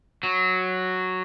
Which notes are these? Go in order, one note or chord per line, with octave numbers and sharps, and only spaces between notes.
F#3